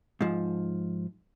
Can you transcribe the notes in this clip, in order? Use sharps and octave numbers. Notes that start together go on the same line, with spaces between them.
G#2 F3